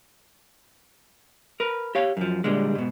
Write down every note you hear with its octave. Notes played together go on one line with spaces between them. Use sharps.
A#4 B4
G4 C#5 F5
F#2 F3
A#2 D3 G3 G#3
G#2 B2